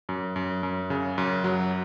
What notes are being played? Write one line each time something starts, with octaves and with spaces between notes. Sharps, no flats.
F#2
F#2
F#2
C#3
F#2
F#3